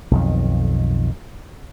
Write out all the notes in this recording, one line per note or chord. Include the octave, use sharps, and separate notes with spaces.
B1 F2 D#3